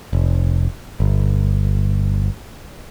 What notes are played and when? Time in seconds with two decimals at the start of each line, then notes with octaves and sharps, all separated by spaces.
0.13 F1
1.00 G1